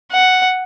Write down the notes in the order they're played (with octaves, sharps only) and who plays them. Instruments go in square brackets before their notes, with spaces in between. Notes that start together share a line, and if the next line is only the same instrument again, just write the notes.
[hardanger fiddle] F#5